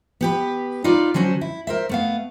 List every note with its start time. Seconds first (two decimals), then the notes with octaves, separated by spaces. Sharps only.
0.21 B3 G4 B4
0.84 D#4 F4 B4 D5
1.14 D3 F#3 C#4 F#4 C5
1.41 E4
1.67 A#4 C5 E5
1.89 A3 B3 F5